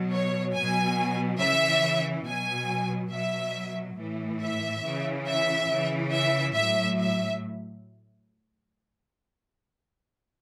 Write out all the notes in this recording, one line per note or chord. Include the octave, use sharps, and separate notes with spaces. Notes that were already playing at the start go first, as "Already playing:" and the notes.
Already playing: B2 F#3
C#5
B2 F#3 G#5
C#3 E3 E5
B2 F#3 G#5
B2 F#3 E5
A2 E3
E5
C#3 E3
E5
C#3 E3
E5
A2 F#3 E5
E5